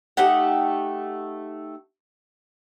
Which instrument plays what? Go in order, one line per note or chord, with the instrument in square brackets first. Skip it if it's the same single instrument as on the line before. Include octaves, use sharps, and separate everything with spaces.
[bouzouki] A3 D#4 G4 F#5